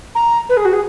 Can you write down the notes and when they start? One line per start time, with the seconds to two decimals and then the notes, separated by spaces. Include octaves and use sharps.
0.15 A#5
0.49 B4
0.57 G#4
0.65 F#4
0.73 G#4